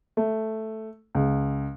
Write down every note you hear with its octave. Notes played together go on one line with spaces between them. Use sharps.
A3
C#2